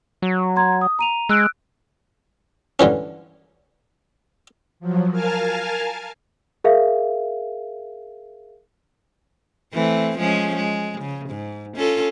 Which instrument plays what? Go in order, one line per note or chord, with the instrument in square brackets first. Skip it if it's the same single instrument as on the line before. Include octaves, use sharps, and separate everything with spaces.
[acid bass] F#3
[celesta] A#5 C6 G#6
D#6
A#5 D#7 F7
[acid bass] G#3 [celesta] E6 F#6 D7
[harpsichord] G2 D3 E3 C#4
[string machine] F3 F#3
A#4 F5 G#5 A5 F6
[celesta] G#4 A#4 E5 F5
[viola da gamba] E3 A3 C4
F3 G#3 C#4
G#3
C#3
G#2
C#4 F4 A4